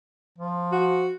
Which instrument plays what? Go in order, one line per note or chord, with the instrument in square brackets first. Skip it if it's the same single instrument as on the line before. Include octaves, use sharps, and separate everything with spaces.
[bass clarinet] F3
[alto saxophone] F#4